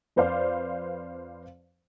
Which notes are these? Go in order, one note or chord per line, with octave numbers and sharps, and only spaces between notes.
F2 B4 C5 D5 F5